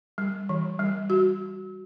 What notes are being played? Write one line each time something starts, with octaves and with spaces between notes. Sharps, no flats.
G3
E3
G3
F#4